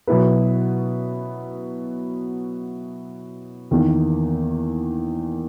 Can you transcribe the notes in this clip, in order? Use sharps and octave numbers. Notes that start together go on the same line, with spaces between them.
B2 F#3 B3 E4 B4
E2 D#3 A#3